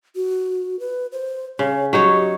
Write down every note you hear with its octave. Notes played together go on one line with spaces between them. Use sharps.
F#4
B4
C5
C#3 C#5
F#3 D#4 G4 C#5